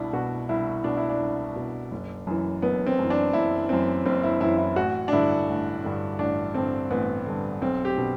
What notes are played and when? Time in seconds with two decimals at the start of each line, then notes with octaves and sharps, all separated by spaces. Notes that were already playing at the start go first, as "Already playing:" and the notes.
Already playing: C2 B2 D4 E4
0.13 B2 F#4
0.49 C2 E4
0.84 B2 D4
0.97 E4
1.09 D4
1.20 C2
1.56 B2
1.91 F#1
2.27 F#2 E3
2.62 F#1 B3
2.87 C4
2.99 F#2 E3
3.10 D4
3.33 F#1 E4
3.69 F#2 E3 C4
4.05 F#1 C4
4.24 E4
4.41 F#2 E3 E4
4.58 E4
4.76 A1 F#4
5.08 D4
5.12 G2 D3 E4
5.48 A1
5.84 G2 D3
6.18 A1 D4
6.54 G2 D3 C4
6.90 A1 B3
7.26 G2 D3
7.62 B1 C4
7.85 G4
7.98 B2